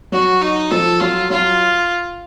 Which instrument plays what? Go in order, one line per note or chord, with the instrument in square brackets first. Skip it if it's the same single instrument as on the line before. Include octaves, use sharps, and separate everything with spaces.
[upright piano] F#3 [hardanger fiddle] F#4
[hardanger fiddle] D#4
[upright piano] F3 [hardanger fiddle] A4
[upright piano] F#3 [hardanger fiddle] F4
[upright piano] F#3 [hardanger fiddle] F4